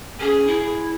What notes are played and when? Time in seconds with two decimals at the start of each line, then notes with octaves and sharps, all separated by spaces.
0.20 C#4 G#4
0.46 E4